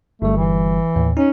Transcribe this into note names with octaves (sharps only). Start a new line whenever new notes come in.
G1 G3 A3
E3
D#2 A2
C#4 D#4